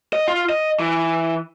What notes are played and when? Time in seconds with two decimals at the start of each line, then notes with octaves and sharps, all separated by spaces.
0.13 D#5
0.28 F4
0.49 D#5
0.79 E3